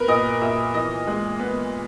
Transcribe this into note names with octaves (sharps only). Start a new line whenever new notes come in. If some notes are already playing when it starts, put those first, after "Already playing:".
Already playing: B3 A#4 B4
A#2 D#5
A#2 E5
E3 D#5
G#3
B3